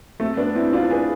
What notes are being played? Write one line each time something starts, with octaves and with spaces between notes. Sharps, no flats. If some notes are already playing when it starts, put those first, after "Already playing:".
A3 C4
B3 D4
C4 E4
D4 F4
G#4 B4